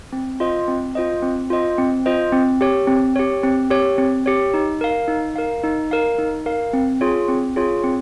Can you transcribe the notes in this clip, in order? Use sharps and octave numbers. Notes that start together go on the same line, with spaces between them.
C4
F4 C5 D#5
C4
F4 C5 D#5
C4
F4 C5 D#5
C4
F4 C5 D#5
C4
G4 C#5
C4
G4 C#5
C4
G4 C#5
C4
G4 C#5
D#4
A#4 F5
D#4
A#4 F5
D#4
A#4 F5
D#4
A#4 F5
C4
F4 G#4 C#5
C4
F4 G#4 C#5
C4